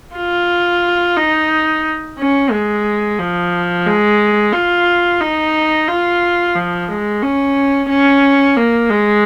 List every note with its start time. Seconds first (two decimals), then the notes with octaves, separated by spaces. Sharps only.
0.16 F4
1.17 D#4
2.18 C#4
2.51 G#3
3.19 F3
3.86 G#3
4.53 F4
5.20 D#4
5.87 F4
6.55 F3
6.88 G#3
7.22 C#4
7.89 C#4
8.57 A#3
8.90 G#3